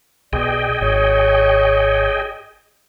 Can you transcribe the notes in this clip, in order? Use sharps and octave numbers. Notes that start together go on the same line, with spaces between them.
B1 G#4 D5 D#5 G5
G#1 C#5